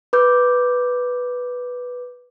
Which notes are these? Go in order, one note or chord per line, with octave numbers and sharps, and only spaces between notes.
B4 D6 G6